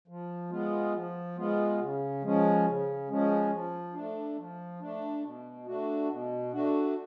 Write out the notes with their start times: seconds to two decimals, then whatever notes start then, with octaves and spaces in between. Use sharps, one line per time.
0.08 F3
0.50 G#3 B3 F4
0.94 F3
1.37 G#3 B3 F4
1.80 C#3
2.22 F3 G#3 C#4
2.65 C#3
3.08 F3 G#3 C#4
3.51 F3
3.93 A3 D4
4.37 F3
4.80 A3 D4
5.23 B2
5.66 A3 D4 F#4
6.09 B2
6.52 A3 D4 F#4